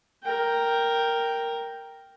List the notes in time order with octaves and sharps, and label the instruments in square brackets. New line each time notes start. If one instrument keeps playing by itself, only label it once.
[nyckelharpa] A#4 G5